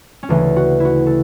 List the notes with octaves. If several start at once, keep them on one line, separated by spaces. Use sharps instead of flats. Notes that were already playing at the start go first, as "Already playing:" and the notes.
C#4
D2 C#3 E3 A3 D4
F#4
E4 F#4
A4